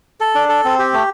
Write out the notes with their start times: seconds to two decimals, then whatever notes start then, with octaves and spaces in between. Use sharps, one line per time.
0.20 A4
0.35 D4
0.49 A4
0.64 C4
0.79 G4
0.93 A3